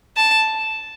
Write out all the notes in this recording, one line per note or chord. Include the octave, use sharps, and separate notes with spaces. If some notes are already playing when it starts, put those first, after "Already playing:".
A5